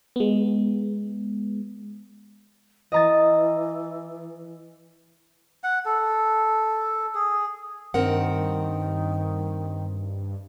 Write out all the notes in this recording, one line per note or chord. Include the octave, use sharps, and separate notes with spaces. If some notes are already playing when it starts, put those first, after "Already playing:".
G#3 B3
E3 D#5 A#5 A6
F#5
A4
G#4
G2 D#3 C4 A#4 F#5